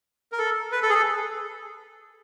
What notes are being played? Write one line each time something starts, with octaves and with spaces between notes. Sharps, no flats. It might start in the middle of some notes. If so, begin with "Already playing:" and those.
A#4
A4
B4
A4
G#4
A4